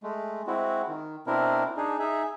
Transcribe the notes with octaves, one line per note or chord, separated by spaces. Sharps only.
G#3 A3
G#3 C4 E4 F#4
D#3
B2 C4 D4 E4 A#4
D4 D#4 G#4
D#4 G#4 E5